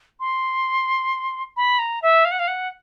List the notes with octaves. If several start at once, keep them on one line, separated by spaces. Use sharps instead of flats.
C6
B5
A#5
E5
F5
F#5
F5
F#5